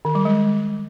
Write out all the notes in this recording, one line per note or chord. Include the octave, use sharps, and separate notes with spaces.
D#3
G3
G#3